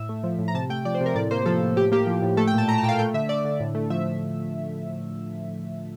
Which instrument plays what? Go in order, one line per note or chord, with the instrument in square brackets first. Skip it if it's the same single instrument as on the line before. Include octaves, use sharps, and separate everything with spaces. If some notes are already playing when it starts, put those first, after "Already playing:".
Already playing: [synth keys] A2 E5
A3
F3
A2
A#5
C3 A5
A3 G5
F3 D5
C5
C3
A#4
A2 D5
A#3 C5
F3 A4
A2
A2 G4
A#3 G4
F3
A2
A3 A4
G5
A#2 A5
A3 A#5
A5
A#2 G5
F5
A3 G5
D3 E5
A3 D5
D3
A2
A3
F3 E5